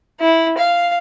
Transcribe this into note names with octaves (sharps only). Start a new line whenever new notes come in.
E4
F5